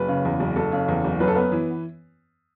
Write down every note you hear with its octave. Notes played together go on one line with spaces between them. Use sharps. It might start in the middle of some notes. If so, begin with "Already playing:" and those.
Already playing: F#1 B4
C#3
E2
F#1
F#1 A4
C#3
E2
F#1
F#2 B4
A4
B3 B4
E3